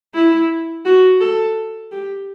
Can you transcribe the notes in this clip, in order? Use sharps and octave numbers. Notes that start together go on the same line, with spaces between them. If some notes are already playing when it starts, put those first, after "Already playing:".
E4
F#4
A4
G4